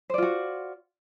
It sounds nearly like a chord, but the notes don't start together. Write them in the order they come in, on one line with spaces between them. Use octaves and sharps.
C5 D5 F4 F#4